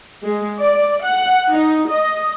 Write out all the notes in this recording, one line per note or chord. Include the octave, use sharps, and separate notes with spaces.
G#3
D5
F#5
D#4
D#5